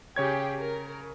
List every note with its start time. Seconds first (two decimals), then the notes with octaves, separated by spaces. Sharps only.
0.16 C#3 G4 G#4 C#5 G#6
0.58 A#4